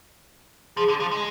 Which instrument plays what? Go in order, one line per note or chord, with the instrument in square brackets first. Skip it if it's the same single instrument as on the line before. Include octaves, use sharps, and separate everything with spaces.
[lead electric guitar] F3 [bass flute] G#4
[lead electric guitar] D3
F3
G#3